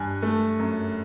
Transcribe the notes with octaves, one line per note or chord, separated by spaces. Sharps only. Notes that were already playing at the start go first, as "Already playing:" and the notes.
Already playing: G2 G#5
A3
F#2